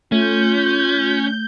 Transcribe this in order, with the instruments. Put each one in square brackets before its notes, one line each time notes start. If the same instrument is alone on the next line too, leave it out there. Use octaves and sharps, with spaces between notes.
[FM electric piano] A3 [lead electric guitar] C#4 [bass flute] F4 [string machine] G6